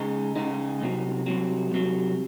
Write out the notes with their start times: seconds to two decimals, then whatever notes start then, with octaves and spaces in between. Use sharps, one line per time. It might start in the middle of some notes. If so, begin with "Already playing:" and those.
Already playing: C#3 G#3 D#4
0.35 C#3 G#3 D#4
0.81 C2 C3 F#3
1.26 C2 C3 F#3
1.72 C2 C3 F#3